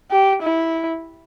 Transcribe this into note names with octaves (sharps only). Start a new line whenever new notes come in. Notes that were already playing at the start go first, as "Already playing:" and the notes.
G4
E4